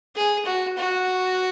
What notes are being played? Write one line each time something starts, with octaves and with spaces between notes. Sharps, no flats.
G#4
F#4
F#4